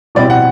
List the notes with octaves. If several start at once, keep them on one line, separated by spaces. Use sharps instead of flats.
B2 G3 C4 E4 D5
F#5